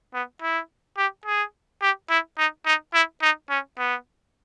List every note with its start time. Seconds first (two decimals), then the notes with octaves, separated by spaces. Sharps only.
0.14 B3
0.42 E4
0.98 G4
1.26 G#4
1.82 G4
2.10 E4
2.38 D#4
2.66 D#4
2.94 E4
3.22 D#4
3.50 C#4
3.78 B3